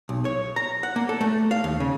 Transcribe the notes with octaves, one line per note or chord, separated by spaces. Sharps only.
B1
C#5
A#5
F#5
A#3
A4
A3
F5
D#2
C#3